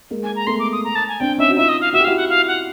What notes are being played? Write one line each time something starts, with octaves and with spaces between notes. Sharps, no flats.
G#3 A#3
G#5
A#5
A3 B3 C6
D6
D#6
A#5
A5
G#5
C4 D4 G5
C#4 D#4 E5
F#4
D#4 F4 E5
D#5
F5
F#4 E5
G4
E4 F#4 F5
F#5
F5
F#5